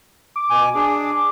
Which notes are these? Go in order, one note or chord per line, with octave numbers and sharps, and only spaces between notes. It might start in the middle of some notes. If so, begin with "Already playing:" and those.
D6
B2 G#5
D4 G#4